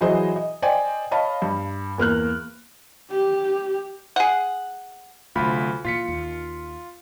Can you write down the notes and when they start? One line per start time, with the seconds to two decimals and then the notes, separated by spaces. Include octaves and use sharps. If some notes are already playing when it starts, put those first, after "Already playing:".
0.01 E3 F#3 G#4 C5 D#5
0.36 D#5
0.62 C5 D5 D#5 G5 G#5
1.11 C#5 D#5 F5 A5 B5
1.42 G2
1.98 E2 A#3 F6 F#6
3.11 G4
4.16 G#4 F#5
5.35 D2 C3 F#3 F4 B5
5.85 A#2 E3 F4 B6 C#7
6.08 D#2